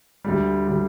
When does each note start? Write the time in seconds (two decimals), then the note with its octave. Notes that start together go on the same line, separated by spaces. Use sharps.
0.25 D2 D3 G3 G4
0.67 D3 G3